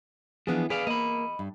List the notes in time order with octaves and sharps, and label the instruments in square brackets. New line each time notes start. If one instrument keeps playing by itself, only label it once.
[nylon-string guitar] E3 B3 G#4 [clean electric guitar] F3 D4
[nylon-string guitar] G#4 G#5 [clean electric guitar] B4 D5 F5
[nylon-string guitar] A#3 [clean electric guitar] D#5 B5
[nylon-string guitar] G2